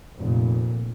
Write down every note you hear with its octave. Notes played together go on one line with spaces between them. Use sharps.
F1 A#2